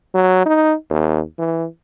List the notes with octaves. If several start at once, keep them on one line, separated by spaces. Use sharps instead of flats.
F#3
D#4
D#2
E3